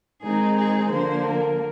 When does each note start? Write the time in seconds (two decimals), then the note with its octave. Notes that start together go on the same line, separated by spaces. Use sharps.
0.23 D#3 G#3 C4 D#4 G#4
0.58 G#4
0.92 D3 F3 A#3 D4 C5
1.27 A#4